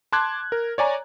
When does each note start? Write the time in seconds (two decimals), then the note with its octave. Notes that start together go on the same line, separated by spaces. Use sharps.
0.12 A5 C6 D6 F#6 G#6
0.52 A#4
0.78 C#5 D5 G#5 A#5